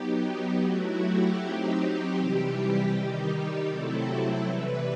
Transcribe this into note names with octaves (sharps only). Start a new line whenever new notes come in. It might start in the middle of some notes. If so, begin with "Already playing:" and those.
Already playing: F#3 B3 D#4 G4
F#3 A3 E4 F#4
G4
F#3 C4 D#4 G4
C3 E3 G3
D#3 G3 D#4 G4
C3 F#3 A3 C4 E4 A4
A4
C3 E3 G3 B4